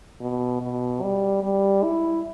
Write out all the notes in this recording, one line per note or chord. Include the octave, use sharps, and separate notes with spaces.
B2
B2
G3
G3
E4